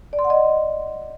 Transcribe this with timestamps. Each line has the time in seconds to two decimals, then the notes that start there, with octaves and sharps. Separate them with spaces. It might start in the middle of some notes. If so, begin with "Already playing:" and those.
0.13 D5
0.19 C6
0.24 F#5
0.30 D#5